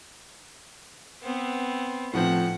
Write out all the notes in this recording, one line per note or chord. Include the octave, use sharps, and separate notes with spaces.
B3 C4
A2 F3 C4 F#5